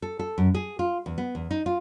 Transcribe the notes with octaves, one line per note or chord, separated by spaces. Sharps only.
A4
A4
F#2
G#4
F4
E2
B3
E2
D#4
F4